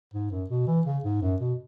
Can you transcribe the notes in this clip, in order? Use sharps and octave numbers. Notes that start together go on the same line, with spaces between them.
G#2
F#2
B2
E3
C#3
G#2
F#2
B2